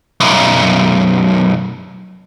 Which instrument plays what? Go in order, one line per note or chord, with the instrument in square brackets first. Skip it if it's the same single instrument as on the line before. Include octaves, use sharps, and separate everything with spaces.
[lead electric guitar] B1 F#2